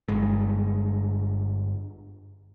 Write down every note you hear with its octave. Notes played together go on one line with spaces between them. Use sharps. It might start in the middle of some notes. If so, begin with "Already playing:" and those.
G1 G2 G#3